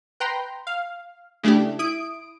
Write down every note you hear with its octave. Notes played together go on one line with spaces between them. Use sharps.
B4 G5 A#5 C6
F5
C#3 A3 D4 E4 G4
E4 D#6 D7